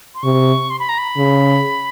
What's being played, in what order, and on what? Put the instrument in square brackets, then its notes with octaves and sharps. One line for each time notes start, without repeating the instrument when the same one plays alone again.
[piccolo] C6
[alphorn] C3 [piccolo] C#6
[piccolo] C6
B5
A#5
B5
[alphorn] C#3